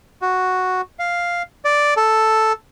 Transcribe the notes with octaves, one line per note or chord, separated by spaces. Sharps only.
F#4
F5
D5
A4